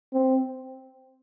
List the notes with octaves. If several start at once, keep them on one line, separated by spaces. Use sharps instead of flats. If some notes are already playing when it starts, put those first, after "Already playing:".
C4